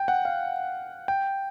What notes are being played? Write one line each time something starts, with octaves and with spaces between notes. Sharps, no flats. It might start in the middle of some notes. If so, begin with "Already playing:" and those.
Already playing: G5
F#5
F5
G5